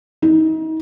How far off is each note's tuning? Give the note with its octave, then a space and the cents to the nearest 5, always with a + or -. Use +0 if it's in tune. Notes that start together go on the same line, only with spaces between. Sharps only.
D#4 +35